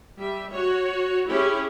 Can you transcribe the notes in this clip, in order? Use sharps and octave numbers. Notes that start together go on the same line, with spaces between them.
G3 E5
F#4 C#5
C#4 E4 G4 G#4